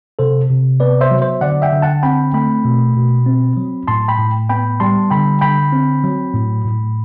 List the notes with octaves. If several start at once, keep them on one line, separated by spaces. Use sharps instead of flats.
C3 A4 C5
C3
B3 B4 D5
C5 E5
F#3
C5 E5
D3 D5 F#5
E5 G5
D3
F#5 A5
C4 G5 B5
A3 G5 B5
B2
B2
C4
F#3
A2 A5 C6
G5 B5
A2
B3 G5 B5
G3 A5 C6
D3 G5 B5
D3 G5 B5
C4
F#3
A2
A2